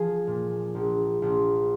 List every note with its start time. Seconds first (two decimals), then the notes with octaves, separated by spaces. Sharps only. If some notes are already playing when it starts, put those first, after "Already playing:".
Already playing: F3 G#4
0.27 A#2
0.75 A#1
1.22 A#1